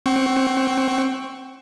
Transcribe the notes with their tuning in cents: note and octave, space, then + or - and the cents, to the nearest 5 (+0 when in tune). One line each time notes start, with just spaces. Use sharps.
C4 +15 F#5 +45 C#6 +0